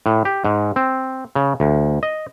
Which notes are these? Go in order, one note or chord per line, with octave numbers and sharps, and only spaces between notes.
A2
G4
G#2
C4
C#3
D2
D#5